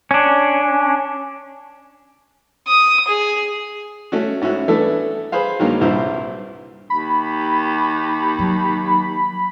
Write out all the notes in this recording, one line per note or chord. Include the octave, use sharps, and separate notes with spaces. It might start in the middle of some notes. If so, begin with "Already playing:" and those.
C#4 D4
D#6
G#4
A3 C#4 F#4
G#2 C#4 E4 F#4
E3 A3 B3 D4 A4
G#4 B4 C5 F5
G2 D#3 F#3 G#3 A#3
C2 G2 A#2 E4 C5
D#2 B5
F#3